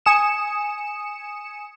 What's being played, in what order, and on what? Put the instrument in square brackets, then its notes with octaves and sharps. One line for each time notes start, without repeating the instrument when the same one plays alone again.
[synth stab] G#5 D#6 C#7 E7